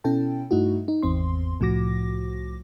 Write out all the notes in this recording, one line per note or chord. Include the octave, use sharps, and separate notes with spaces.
B2 C#4 E4 A4 G5 A5
G2 A3 D#4 E4 F#4
D#4
G#1 E2 C4 C6
C2 A2 F3 F#4 D6 A#6